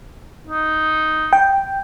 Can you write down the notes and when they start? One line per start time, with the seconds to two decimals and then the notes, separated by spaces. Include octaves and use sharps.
0.47 D#4
1.33 G5